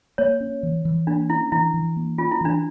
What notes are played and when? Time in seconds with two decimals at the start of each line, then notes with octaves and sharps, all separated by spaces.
0.18 A#3 C#5
0.41 C#4
0.63 E3
0.85 E3
1.07 A#3 D4
1.29 C#4 E4
1.52 E3 E4
1.74 E3
1.96 A#3
2.18 C#4 F4
2.31 E4
2.41 E3 D4